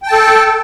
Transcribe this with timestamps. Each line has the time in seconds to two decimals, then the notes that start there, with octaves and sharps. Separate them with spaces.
0.03 G5
0.07 A5
0.12 A4